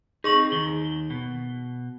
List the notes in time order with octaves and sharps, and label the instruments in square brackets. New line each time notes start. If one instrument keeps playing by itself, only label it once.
[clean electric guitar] C4 D#4 [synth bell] G#4 C#6 F#7
[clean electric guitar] D#2 D#3 [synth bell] G7
[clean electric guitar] B2